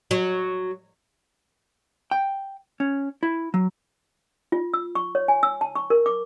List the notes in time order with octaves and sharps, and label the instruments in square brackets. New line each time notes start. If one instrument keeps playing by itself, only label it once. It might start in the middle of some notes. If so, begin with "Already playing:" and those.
[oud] F#3
[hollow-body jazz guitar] G5
C#4
E4
F#3
[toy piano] F4
E6
C#6
C#5
G#5
E6
A5
C#6
A#4
D6